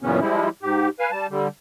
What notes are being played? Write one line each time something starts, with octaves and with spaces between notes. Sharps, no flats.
F#2 A#2 C#3 E3 B3 C#4
F3 G3 G#3 E4
G#2 G4
B4 F5 G#5
G3 A5
D3 G3